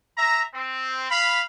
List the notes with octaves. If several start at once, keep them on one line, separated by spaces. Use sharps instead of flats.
E5 A#5
C4
F5 B5